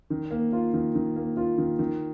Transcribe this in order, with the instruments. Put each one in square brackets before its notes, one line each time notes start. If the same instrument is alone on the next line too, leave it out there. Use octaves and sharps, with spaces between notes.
[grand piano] D#3
A#3
F4
D#3
D#3
A#3
F4
D#3
D#3